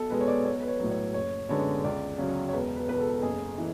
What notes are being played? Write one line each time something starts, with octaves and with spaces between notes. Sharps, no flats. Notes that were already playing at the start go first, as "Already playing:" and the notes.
Already playing: B1 A4
B2 G#3 B3 B4
C#5
D5
B1 C#5
B4
C#5
A2 F#3
C#5
F#1 C#5
F#2 D3 G#3 B3 C#5
C#2 D5
C#3 F#3 C#5
C#5
E1 B4
B4
E2 B2 B4
A4
F#1 G#4
E3